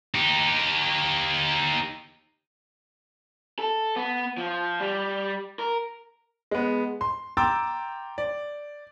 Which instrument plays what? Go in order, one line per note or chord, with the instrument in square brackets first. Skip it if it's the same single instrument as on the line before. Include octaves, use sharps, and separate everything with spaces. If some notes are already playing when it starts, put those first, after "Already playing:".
[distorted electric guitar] D#4 G4
[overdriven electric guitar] A4
B3
F3
G3
A#4
[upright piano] G#3 B3
C6
G5 A#5 C6 D6 E6 A6
D5